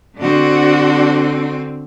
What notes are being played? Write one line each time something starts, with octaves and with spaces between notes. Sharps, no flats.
D3 C4 D4 F#4